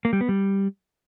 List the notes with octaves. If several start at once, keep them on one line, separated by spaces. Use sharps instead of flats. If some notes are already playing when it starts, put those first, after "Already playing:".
A#3
G3
B3
G3